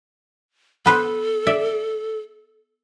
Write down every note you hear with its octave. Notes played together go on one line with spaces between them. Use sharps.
B3 A4 B4 C5
D5 E5